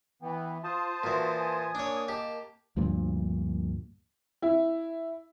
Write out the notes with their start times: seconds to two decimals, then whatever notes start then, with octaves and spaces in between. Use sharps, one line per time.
0.22 E3 B3 G5
0.64 F4 C5 A5 D#6
1.04 A#2 E3 F#4
1.39 G#5
1.75 A#3 D4 C#5
2.08 G4 D#5 A5
2.76 D2 G2 A#2 F3
4.42 E4